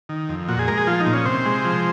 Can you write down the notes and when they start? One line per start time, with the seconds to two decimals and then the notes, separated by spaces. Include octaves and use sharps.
0.09 D#3
0.29 F2
0.48 A#2 F#4
0.59 G#4
0.68 G#3 A#4
0.78 G#4
0.87 F3 F4
1.00 D#4
1.06 A#2
1.13 C#4
1.25 C3 C5
1.46 G#3
1.65 F3